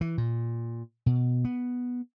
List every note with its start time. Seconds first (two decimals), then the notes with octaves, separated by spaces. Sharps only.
0.01 E3
0.18 A#2
1.06 B2
1.45 B3